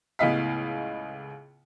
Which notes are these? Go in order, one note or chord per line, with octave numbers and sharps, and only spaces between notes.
C#2 A2 B3 D#5 F5 B6